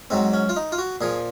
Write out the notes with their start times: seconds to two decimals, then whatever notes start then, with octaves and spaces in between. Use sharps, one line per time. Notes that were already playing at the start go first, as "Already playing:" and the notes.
0.10 G#2 F#3 C4
0.33 C#4
0.49 F4
0.56 D#4
0.72 F4
0.78 F#4
1.01 A#2 F3 G#4